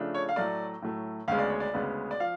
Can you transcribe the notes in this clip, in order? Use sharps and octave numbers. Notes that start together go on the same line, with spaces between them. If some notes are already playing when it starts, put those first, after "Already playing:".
Already playing: C#3 F3 A3 D4
C#5
F5
A2 F#3 A3 D5
A2 F#3 A3
D2 C#3 G#3 B3 F5
D5
C#5
D5
D2 C#3 G#3 B3
D5
F3 F5